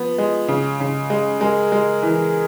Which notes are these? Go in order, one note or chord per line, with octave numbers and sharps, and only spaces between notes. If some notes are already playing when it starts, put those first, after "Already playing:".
Already playing: F3 B3
G#3
C#3
C#3
G#3
G#3 G#4 A#4
G#3
E3